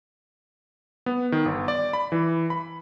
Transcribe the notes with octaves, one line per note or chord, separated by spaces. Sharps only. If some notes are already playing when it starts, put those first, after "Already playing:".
B3
D#3
G1
D5
B5
E3
B5